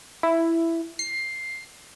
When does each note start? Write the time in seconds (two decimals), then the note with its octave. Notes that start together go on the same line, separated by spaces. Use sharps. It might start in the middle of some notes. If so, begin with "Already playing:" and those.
0.23 E4
0.99 C7